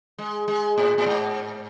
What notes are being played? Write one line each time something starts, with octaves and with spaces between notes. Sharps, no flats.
G#3
G#3
A2
A2
G#2